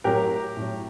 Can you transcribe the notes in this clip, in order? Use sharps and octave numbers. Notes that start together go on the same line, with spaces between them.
A2 F#3 G4 A#4
A2 F#3